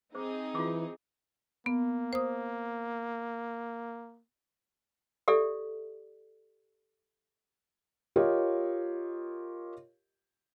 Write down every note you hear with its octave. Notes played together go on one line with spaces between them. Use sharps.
C4 D#4 G#4 C5 D6
E3 F4 C6 D6
A#3 B3
C5 D#6
G4 A4 D5 E5
F4 G4 A#4 C#5 D#5